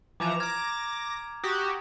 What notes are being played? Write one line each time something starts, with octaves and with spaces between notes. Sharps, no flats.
E3 F3 A#5 D6 E7 F7
A#5 D6 F6 G#6 A#6
F#4 G4 D#6